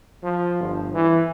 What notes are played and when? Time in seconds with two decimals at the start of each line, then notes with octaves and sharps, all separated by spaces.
0.23 F3
0.60 G1
0.94 E3